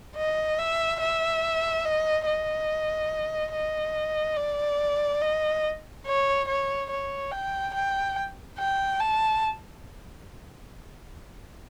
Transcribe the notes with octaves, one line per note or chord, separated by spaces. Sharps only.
D#5
E5
E5
D#5
D#5
D#5
D5
D#5
C#5
C#5
C#5
G5
G5
G5
A5